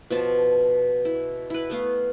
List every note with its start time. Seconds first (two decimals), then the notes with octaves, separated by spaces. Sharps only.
0.10 B2 F3 A5
1.05 E4
1.50 E4 B4
1.70 A3 B3 F5